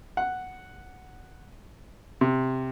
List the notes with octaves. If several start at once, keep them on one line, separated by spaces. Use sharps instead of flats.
F#5
C3